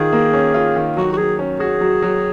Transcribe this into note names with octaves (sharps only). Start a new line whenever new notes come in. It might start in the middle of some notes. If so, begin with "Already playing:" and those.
Already playing: D#3 F4 G#4
A#3
C#4
F4
D#3
F#3 F#4
F#4
F#3 G#4
C#4
F#4 G#4
F#3
F#3